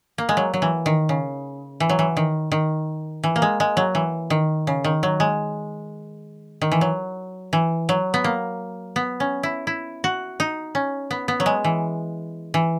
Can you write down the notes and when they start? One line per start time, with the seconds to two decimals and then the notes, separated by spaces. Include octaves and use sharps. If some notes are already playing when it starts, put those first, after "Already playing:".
0.18 A#3
0.29 G#3
0.37 F#3
0.54 F#3
0.62 E3
0.86 D#3
1.09 C#3
1.80 E3
1.89 F#3
1.99 E3
2.17 D#3
2.52 D#3
3.24 E3
3.36 A#3
3.42 G#3
3.60 G#3
3.77 F#3
3.95 E3
4.30 D#3
4.67 C#3
4.84 D#3
5.03 F#3
5.20 G#3
6.62 D#3
6.72 E3
6.81 F#3
7.53 E3
7.89 F#3
8.14 B3
8.24 A#3
8.96 B3
9.20 C#4
9.43 E4
9.67 E4
10.04 F#4
10.40 D#4
10.75 C#4
11.11 B3
11.28 B3
11.40 F#3
11.46 G#3
11.64 E3
12.54 E3